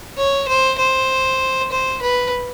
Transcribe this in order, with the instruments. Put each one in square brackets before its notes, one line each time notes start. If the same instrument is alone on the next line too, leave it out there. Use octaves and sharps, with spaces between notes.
[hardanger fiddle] C#5
C5
C5
C5
B4